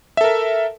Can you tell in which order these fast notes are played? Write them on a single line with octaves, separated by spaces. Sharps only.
E5 A4 A#4